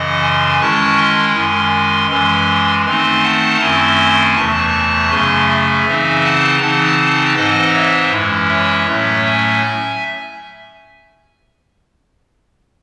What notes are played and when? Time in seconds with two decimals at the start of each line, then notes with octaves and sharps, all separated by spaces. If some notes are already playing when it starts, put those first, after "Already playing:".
Already playing: F#2 C#3 E3 D#5 F#5
0.22 G#5 C6
0.60 D#3 G#3 C#4 E4 A5 C#6
0.98 G#5 C6
1.35 F#2 D#3 G#3 G#5 C6
2.10 F#2 E3 G#3 G#5 C6
2.86 D#3 A3 C4 D#4 G#5 C6
3.23 F#5 A5
3.61 F#2 D#3 A3 C4 E4 G#5 C6
4.35 E2 C3 E3 A3 A5 C#6
5.11 F#2 C#3 F#3 A3 G#5 C6
5.49 E5 G#5
5.86 C#3 E3 C4 D#4
6.24 F#5 A5
6.61 C#3 E3 C4 D#4 F#5 A5
7.36 G#2 E3 C4 D#4 D#5 F#5
7.73 C#5 E5
8.12 F#2 E3 G#3 C#4 E4
8.49 C#5 E5
8.87 A2 F#3 A3 C#4
9.25 E5 G#5